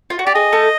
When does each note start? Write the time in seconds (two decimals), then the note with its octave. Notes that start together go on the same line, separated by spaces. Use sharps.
0.10 F4
0.19 F#4
0.27 G4 D5
0.35 G#4 D#5
0.53 A3 A4